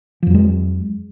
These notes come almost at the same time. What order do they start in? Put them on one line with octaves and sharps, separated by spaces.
F3 F2 F#3 G#3